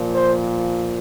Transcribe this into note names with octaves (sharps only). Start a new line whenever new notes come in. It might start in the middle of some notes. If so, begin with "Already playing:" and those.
Already playing: A#2 F3
C5